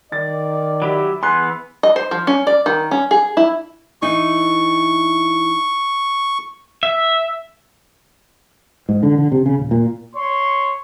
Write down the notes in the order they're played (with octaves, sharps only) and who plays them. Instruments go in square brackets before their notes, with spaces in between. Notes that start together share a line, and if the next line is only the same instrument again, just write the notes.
[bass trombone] D#3 [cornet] D5 [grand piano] A6
[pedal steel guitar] F#3 G4 E5 [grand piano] B5
[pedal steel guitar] E3 B3 F#6 [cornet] G#4 [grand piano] C6
[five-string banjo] D#5
C5
F3
C#4
D5
D#3
C#4
G#4
E4
[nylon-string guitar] E3 D#4 [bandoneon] C#6
[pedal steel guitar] E5
[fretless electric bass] G#2
D3
D3
C3
C#3
D#1
A#2
[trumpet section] C#5 C6